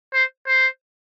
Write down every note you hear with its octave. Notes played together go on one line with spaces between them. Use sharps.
C5
C5